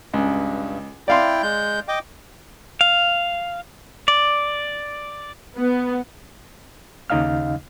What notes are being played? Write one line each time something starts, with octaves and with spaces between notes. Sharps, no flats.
C#2 G2
E4 D5 F5 G5 C6
G#3 G6
D#5 G5 D6
F5
D5
B3
D#2 C#3 D#4 D#5 F5 F6